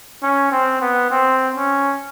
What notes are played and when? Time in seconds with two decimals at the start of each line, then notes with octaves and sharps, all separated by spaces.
0.23 C#4
0.51 C4
0.81 B3
1.10 C4
1.55 C#4